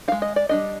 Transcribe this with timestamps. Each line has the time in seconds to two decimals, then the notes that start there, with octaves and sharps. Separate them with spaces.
0.08 G#3 D#4 F5
0.22 D#5
0.36 D5
0.49 G3 D4 D#5